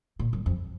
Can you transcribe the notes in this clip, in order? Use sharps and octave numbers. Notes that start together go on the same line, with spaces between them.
A#2
F#2
F2